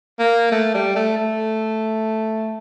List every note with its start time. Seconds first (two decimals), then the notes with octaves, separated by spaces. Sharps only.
0.19 A#3
0.52 A3
0.74 G3
0.96 A3
1.17 A3